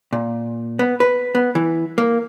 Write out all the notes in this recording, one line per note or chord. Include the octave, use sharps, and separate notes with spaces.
A#2
B3
B4
B3
E3
A#3